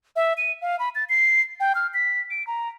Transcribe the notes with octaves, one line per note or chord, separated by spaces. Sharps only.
E5
D#7
F5
B5
A6
C7
G5
F6
B6
D7
A#5